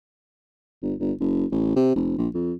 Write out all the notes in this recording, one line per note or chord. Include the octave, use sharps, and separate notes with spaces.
G1
G1
F#1
A1
C3
F1
A#1
F2